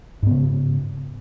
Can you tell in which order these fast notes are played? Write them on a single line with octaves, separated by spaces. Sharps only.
G#2 B3 C#3